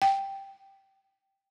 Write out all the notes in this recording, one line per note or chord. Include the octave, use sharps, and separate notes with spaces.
G5